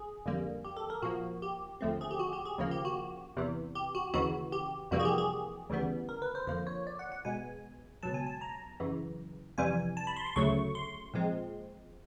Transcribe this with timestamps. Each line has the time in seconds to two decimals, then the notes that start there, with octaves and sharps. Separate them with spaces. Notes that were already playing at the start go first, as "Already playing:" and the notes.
Already playing: G#4
0.26 F2 D3 G3 A#3
0.65 G4
0.77 A4
0.90 A#4
1.02 A#2 F3 A#3 F#4
1.42 G4
1.81 D#2 D3 F3 A3 C4
2.01 G#4
2.11 G4
2.19 F#4
2.33 G4
2.45 G#4
2.58 D#2 C#3 F3 A#3
2.71 G4
2.85 F#4
3.37 E2 C3 E3
3.75 G4
3.95 F#4
4.14 D#2 C#3 E3 F#4
4.52 G4
4.91 F2 C3 E3 G3 A#3 F#4
5.00 G#4
5.05 G4
5.18 G#4
5.69 D2 C#3 E3 G3 B3
6.09 A#4
6.22 B4
6.35 C5
6.47 F2 D3 F3 A#3 C5
6.67 C#5
6.87 D5
6.99 F#5
7.12 F#5
7.25 B2 G#3 B3 G#5
8.03 C#2 B2 F#3 A5
8.14 G#5
8.26 A5
8.41 A#5
8.80 F#2 C#3 E3
9.58 F2 C3 E3 G3 G#5
9.97 A5
10.07 B5
10.17 C6
10.27 C6
10.36 D2 C#3 F#3 A3 C#6
10.75 C6
11.14 A#2 F3 G#3 C4